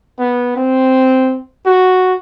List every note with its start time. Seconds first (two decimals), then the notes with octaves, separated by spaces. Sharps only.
0.18 B3
0.56 C4
1.66 F#4